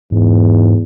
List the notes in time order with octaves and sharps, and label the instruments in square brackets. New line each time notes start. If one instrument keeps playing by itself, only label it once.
[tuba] E2 [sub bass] G#2